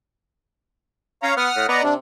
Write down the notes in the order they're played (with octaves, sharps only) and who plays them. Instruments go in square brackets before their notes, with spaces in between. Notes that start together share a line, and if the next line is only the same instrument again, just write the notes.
[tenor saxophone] C#4 [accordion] C#5 F5 A#5
[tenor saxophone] B3 [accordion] F#5 D#6 F6
[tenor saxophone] A2
[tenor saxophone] B3 [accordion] D5 D#5 A#5
[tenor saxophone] C3 [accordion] D4